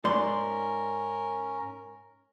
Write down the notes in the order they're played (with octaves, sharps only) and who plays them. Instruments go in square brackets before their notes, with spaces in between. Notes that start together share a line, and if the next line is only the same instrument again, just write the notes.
[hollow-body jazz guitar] G#2 D5 C6 [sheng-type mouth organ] C#4 A#4